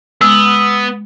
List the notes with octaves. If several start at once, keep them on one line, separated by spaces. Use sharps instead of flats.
G#3 B3 D#6 E6